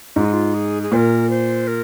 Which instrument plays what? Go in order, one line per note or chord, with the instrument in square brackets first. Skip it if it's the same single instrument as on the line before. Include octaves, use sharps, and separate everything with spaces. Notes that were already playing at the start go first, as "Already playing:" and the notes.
[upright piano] G#2 [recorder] F4
[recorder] D#4
F4
G#4
G#4
[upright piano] A#2 [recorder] C5
[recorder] A#4
C5
A#4